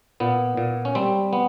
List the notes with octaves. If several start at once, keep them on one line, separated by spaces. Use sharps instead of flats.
A#2 B3
A#2
C#4
G3 C4
B3